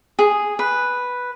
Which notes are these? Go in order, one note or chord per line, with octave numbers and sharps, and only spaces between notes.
G#4
B4